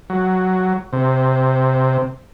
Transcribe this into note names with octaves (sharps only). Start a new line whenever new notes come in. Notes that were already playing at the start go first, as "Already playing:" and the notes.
F#3
C3